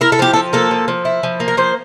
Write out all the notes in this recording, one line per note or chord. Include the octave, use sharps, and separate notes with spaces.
E4 A#4
A4
F3 G4
A4
F3
A#3 A4
F3
F3
E4
F3
A#3
A#4
F3 C5